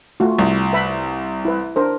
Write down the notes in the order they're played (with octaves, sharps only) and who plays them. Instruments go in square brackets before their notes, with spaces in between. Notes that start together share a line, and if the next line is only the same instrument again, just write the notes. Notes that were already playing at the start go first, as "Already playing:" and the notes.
[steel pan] A3 F4 F#4
[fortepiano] C2
[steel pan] B4 E5 B5
E4 B4
D4 A#4 C5